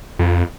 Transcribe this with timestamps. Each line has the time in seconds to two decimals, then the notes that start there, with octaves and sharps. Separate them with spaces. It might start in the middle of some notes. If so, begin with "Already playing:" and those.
0.19 F2